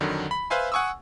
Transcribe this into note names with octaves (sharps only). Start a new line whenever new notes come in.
F2 D3 D#3 F#3
B5
B4 C5 E5 F5 G#5 C6
F#5 G#5 C#6 D#6 E6